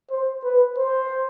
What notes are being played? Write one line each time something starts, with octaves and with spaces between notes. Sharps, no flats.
C5
B4
C5